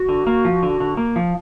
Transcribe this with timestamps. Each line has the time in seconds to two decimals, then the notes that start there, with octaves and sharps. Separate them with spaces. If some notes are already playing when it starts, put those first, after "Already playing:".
Already playing: F#4
0.09 D3
0.27 A#3
0.45 F3
0.63 D3
0.80 D3
0.97 A#3
1.16 F3